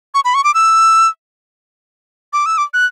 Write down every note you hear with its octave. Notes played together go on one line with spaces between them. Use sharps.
C#6
B5
C#6
D6
E6
D6
E6
D6
F#6